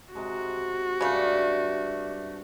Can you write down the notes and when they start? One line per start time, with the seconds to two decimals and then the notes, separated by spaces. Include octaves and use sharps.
0.15 C3 G#3 D#4 F#4
1.01 G2 C#3 A3 D5